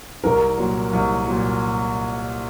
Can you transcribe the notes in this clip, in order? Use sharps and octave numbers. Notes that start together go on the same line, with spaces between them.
C2 A#4
A#2 F#3
C2
A#2 F#3